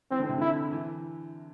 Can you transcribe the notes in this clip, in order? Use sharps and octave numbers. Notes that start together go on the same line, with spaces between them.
E3 C4
D3
C3
D3 E4
E3